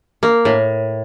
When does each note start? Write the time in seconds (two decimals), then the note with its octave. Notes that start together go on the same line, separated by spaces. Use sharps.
0.23 A#3
0.45 A2